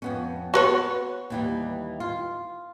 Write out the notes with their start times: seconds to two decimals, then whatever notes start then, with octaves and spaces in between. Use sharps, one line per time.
0.02 F2 B3 C#4
0.54 B3 F#4 B4 C#5
1.30 D#2 E3 G3
2.00 F4